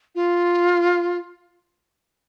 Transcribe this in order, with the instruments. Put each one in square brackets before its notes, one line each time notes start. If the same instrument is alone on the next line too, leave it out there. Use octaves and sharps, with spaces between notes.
[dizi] F4